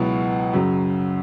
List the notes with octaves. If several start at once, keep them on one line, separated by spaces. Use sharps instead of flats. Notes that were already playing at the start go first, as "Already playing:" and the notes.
Already playing: C#2 B2 F#3 B3 E4
F#2 C#3 F#3